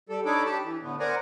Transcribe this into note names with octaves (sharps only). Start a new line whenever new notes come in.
G3 A4
D4 D#4 A4 C#5 B5 D6
G4 A5
E3
A2 D3 B3
A#4 C5 D5 F#5 G#5 A#5